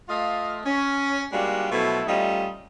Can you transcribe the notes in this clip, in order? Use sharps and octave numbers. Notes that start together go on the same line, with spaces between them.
A3 F4 D#5 F5
C#4
G3 G#3 A#3 D4 F4 F#4
B2 F3 F#3 A3 E4 A4
G3 A3 C#4 D#4 F4 D#5